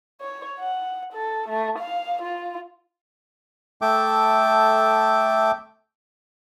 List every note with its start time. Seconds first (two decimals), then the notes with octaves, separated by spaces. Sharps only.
0.21 C#5
0.59 F#5
1.13 A4
1.49 A3
1.79 F5
2.22 F4
3.82 A3 A4 E5 G5 D6